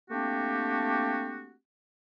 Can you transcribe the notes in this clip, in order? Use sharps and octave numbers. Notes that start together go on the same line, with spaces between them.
A3 A#3 C4 D4 F#4 G4